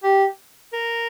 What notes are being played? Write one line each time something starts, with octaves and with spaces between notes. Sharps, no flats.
G4
A#4